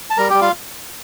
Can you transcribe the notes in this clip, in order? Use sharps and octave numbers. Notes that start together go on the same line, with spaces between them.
A5
G3 A#4 A#5
G3 G4 G5
F4 F5